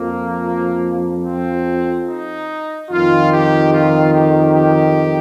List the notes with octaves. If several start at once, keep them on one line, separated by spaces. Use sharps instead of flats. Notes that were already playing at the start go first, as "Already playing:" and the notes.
Already playing: F2 F3 A#3
C4
D#4
F2 D#3 F4
G4
F4
G4
G4